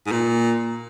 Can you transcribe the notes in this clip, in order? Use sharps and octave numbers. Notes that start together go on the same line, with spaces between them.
G#2
A#2